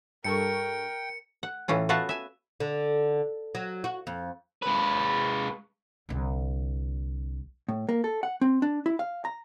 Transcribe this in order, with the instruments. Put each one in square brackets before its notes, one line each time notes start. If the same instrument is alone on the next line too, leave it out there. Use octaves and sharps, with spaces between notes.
[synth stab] G2 A4 C#6 [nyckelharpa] A#4 [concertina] G5 [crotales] C#7
[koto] F#5
A2 E3 C#4 F4
B3 F4 F#4 E5 F#5 A5
E5 G#5
[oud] D3
F#3
F#4
F2
[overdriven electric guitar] G#3 B4
[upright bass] C2 D3
[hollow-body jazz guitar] A2
A#3
A4
F#5
C4
D4
E4
F5
A#5